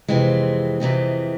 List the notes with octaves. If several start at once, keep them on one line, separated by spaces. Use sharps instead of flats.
F2 C3 E3 G#3 C4
F2 C3 E3 G#3 C4